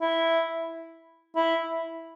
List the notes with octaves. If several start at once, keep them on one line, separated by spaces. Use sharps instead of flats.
E4
E4